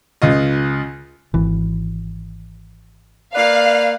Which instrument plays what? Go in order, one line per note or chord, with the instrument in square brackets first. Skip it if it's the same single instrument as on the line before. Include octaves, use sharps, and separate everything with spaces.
[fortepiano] C#2 C#3 F4 D#5
[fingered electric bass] G#1 [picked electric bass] E3
[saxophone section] A#3 B4 D5 [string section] F5